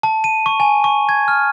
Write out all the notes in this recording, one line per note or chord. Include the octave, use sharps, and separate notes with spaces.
A5
D#7
C#6
G#5
C#6
G#6
F6